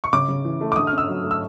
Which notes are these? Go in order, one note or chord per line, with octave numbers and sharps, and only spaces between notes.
C#6
C#3 D6
C#3
E3
A3
D6
D3 D#6
F6
C#4
E6
F#3
A3
E6